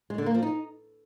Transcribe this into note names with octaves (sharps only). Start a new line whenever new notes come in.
G#3
D3
A#3
F3
D#4